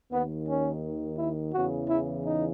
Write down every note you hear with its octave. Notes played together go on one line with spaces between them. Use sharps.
D#2 D#3 B3
C#4
E4
E2 C#3 E3 F#4
E4
D#4